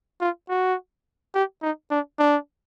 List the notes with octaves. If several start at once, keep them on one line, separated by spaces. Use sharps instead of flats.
F4
F#4
G4
D#4
D4
D4